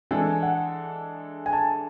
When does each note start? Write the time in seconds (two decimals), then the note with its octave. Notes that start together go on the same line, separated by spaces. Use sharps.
0.11 E3 G#3 D4 A4 G#5
0.43 F#5
1.46 G#5
1.53 A5